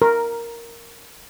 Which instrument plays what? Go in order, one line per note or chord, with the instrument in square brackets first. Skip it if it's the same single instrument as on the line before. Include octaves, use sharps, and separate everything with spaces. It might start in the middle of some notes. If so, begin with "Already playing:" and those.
[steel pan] A#4